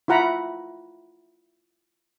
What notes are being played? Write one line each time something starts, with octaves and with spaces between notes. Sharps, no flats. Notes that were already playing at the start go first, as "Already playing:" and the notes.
E4 F4 F#5 A#5 B5